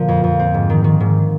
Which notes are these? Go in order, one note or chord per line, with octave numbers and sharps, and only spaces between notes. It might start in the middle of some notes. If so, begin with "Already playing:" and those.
Already playing: A#2 D3 F3 A#3
F2
F2
C4
G#2
D#3
D#3
G#2